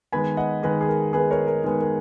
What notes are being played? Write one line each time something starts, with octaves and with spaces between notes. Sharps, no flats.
D#3 G#3 B3 G#5 B5
D#5 F#5
D#3 G#3 B3 G#4 B4
G#4
A#4
D#3 G#3 B3 G#4 B4
A#4 C#5
A#4
D#3 G#3 B3 A#4
A#4